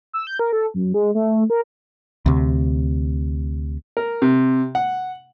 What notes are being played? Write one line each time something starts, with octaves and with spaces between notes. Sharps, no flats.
E6
G6
A#4
A4
F#2
G#3
A3
A#4
D2 C3
A#4
C3
F#5